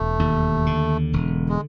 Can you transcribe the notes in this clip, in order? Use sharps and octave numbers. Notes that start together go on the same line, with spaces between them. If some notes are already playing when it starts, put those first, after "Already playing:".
Already playing: E1 A3
D#2
D3
E1
G#3